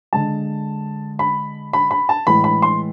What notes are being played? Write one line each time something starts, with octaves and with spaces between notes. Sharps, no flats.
D3 G#3 A5
B5
B5
B5
A5
A2 E3 G#3 B5
B5
C6